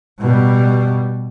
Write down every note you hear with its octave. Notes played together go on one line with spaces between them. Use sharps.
B2 G3